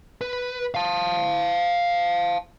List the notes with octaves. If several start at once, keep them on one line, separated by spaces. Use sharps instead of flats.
B4
F5 A5